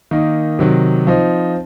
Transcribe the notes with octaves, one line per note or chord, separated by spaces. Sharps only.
D#3 A#3 D#4
C3 D#3 F#3
F3 C4 D#4